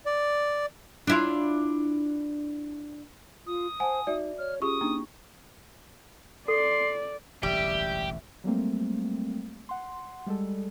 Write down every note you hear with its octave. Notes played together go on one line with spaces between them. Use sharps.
D5
D4 E4 F4
F4 D#6
C5 F#5 G#5 A5
D#4 F#4 D5 E5
C#5 F6
C#4 F4 G4 G#4 C#6 D#6
A#3 D4 D#4
A4 D5 C6
E1 A1 D2 G3 G4 E5
F#3 G3 A3 A#3 C4
F#5 C6
G3 G#3 A4